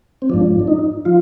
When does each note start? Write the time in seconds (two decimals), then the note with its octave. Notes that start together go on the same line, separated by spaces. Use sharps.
0.22 C4
0.29 G#2 F3 D4
0.59 D4
0.68 D#4
1.05 F3 F4